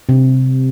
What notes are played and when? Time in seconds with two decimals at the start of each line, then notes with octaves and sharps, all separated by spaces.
0.09 C3